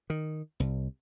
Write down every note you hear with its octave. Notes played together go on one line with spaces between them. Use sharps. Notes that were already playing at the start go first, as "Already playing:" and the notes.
D#3
C2